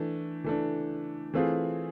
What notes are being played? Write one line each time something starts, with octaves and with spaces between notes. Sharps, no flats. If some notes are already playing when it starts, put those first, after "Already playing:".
Already playing: E3 A3 D4
E3 A3 D4
E3 A3 C4 F4 G#4